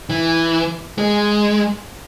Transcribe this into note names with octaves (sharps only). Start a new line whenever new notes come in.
E3
G#3